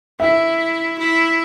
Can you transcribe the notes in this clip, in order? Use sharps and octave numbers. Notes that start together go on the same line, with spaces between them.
E4 E5
E4